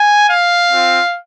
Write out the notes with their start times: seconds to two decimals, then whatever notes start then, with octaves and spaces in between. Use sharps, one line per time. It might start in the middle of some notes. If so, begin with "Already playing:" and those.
Already playing: G#5
0.30 F5
0.71 C4 F4